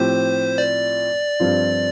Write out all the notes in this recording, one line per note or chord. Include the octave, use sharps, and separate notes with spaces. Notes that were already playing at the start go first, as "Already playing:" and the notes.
Already playing: A2 F3 C4 G4 C5
D5
G2 F3 C4 F4